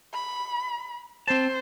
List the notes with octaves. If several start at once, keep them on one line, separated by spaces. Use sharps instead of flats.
B5
C4 C5 A5